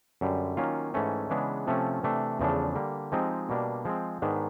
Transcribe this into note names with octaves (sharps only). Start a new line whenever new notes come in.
F#2 D3 G3
D#3 F#3 A#3 C#4 F4
G#2 E3 A3 C#4
C#3 E3 G#3 B3 D4
C3 F3 A3 C#4
C3 E3 A3 D4
E2 C#3 F3 A3 D4
D3 G3 A#3
F3 G#3 C4 D#4 G4
B2 G3 A#3 D4
F3 G#3 C4
G#2 D#3 G#3 B3 D4